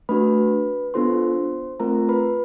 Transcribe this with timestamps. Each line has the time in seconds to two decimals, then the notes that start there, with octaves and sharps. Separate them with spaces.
0.09 A3 D4 F#4 B4 B5
0.94 B3 D4 F4 A4 C5 C6
1.80 A3 C4 F4 A#4 A#5
2.09 B4 B5